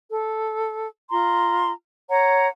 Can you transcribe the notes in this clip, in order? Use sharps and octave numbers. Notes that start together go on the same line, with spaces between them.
A4
F4 A#5 C6
C#5 F#5 A#5